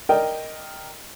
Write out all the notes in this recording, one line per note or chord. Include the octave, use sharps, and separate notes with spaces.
A#4 D5 D#5 G5